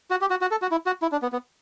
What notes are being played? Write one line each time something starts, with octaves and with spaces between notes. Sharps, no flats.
F#4
G4
F#4
F#4
A4
F#4
E4
F#4
E4
D4
B3
B3